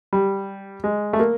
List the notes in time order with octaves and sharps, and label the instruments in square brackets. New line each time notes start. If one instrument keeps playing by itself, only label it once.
[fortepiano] G3
G#3
A3
A#3